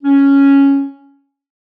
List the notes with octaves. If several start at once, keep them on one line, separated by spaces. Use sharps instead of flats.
C#4